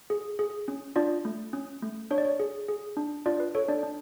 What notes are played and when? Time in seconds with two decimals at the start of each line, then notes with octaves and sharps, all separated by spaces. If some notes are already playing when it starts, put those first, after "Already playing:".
0.10 G#4
0.39 G#4
0.68 C#4
0.96 D4 F4 D5
1.25 A3
1.53 C#4
1.82 A3
2.11 D4 C#5
2.18 D5
2.25 C#5
2.40 G#4
2.68 G#4
2.97 D4
3.26 D4 F4 D5
3.40 B4
3.55 A4 C#5
3.68 D4 D5
3.83 D4